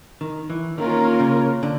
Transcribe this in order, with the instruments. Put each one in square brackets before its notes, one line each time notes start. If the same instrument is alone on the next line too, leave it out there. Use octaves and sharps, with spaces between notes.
[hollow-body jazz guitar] D#3
E3
[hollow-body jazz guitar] D#3 [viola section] A#3 C#4 F4 A#4
[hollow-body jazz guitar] C#3
D3